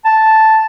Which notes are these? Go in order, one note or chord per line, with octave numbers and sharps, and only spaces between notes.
A5